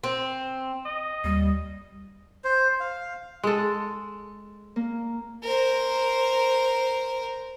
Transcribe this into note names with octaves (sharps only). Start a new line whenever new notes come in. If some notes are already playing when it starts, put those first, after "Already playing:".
C4
D#5
D#2 G3
C5
F5
G#3 A4
A#3
A#4 C5